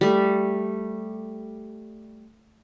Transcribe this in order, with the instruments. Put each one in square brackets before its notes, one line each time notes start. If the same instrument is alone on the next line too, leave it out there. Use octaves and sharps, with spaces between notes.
[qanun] G3 A3